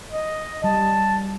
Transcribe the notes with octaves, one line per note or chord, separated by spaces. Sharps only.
D#5
G3 A5